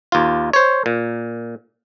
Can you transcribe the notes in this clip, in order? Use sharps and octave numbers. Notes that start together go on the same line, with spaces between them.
D#2 F4
C5 C#5
A#2